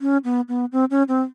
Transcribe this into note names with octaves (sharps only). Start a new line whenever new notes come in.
C#4
B3
B3
C4
C#4
C4